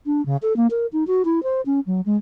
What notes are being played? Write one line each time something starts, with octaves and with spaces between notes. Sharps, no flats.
D4
C#3
A4
A#3
A#4
D#4
F#4
E4
C5
C#4
F#3
G#3